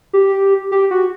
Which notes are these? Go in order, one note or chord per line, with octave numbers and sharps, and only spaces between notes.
G4
G4
F#4